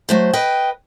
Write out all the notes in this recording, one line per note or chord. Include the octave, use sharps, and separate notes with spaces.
F#3 A3 C5
B4 D#5 G5